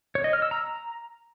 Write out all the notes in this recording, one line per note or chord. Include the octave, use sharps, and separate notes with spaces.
C#5
D#5
F6
E6
A#5